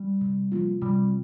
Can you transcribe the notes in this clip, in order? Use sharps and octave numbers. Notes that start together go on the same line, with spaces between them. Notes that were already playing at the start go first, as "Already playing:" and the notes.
Already playing: G3
C3
F3 A#3 F4
C3 G3